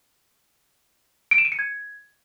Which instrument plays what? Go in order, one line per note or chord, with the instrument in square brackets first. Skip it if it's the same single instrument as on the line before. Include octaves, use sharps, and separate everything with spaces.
[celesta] D7
E7
D#7
C#7
G#6